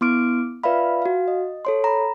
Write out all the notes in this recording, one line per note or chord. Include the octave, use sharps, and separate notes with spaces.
B3 E4 C6 D6 F6 D7
F4 B4 D5 E5 F5 B5
F#4 F5
D#5
A4 C#5 C6
A#5 B5